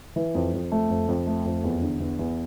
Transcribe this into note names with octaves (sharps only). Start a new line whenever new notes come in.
E3
F2
F2
A3
F2
F2
A3
F2
E2
D3
E2
E2